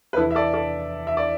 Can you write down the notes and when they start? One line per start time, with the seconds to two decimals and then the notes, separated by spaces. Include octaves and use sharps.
0.13 B4
0.17 E2 E4 A4
0.21 E3
0.31 E5
0.35 A4 D5
0.54 A4 D5
1.07 E5
1.17 D5